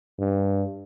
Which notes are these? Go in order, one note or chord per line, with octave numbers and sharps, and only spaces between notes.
G2